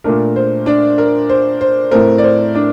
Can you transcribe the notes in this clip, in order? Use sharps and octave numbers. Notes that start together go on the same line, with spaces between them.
A#2 A3 D4 A#4
C5
D4 D5
A#4
C5
C5
A2 A3 C4 A#4
D5
C5
D4 D5